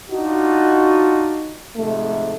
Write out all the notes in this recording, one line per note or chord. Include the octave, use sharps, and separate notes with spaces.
D4 D#4 F4 F#4
G#2 C3 F3 A3